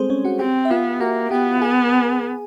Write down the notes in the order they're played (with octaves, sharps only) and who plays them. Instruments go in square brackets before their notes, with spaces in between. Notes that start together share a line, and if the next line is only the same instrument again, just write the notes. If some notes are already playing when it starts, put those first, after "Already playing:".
Already playing: [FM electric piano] G3 G#3 C4 G#4 A4 C5
C#4 C#5
F#4 F#5
[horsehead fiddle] C4 [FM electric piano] G4 G5
[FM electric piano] E5
[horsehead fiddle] B3 [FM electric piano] F4 F5
[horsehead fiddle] A#3 [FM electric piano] F#4 F#5
[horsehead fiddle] B3 [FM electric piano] G4 G5
[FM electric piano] G#4 G#5